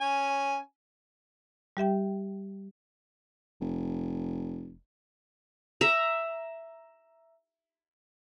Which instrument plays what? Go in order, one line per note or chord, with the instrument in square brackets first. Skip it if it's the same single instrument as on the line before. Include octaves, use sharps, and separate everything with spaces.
[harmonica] C#4 G#5
[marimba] G3 G4 E5 G5
[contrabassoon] F1
[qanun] E5 A#5